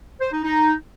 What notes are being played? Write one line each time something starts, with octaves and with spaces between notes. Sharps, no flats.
C5
D#4
D#4